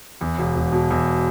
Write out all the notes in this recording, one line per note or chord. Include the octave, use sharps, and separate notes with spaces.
E2
E1
E1
B2
E2